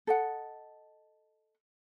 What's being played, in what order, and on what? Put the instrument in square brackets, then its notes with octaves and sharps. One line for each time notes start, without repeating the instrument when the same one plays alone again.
[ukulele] A4 D#5 F#5